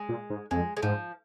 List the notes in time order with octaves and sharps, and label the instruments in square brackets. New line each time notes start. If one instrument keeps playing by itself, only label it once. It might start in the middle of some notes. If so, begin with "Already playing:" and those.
Already playing: [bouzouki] G#3
[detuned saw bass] A#2
G#2
[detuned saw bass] F2 [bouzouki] G#3
[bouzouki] G#3
[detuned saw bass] G#2 [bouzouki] F3